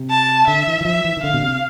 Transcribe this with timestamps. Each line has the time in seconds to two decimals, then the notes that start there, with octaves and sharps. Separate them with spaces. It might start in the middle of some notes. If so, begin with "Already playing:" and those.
Already playing: C3
0.10 A5
0.47 D3 E5
0.67 E3
0.81 E3
0.85 F3 E5
1.04 E3
1.17 D#3
1.23 D3 F5
1.34 B2
1.42 C3